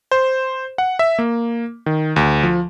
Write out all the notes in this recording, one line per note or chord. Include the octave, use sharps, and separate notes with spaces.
C5
F#5
E5
A#3
D#3
D2
F3